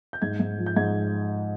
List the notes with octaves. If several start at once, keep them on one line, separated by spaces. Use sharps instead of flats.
G6
G#2 G#6
G#2
F3
G6
G#2 G#6